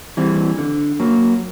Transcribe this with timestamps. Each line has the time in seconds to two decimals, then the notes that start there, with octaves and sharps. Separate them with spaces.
0.17 E3 G3 C4
0.58 D3
1.00 F#3 A#3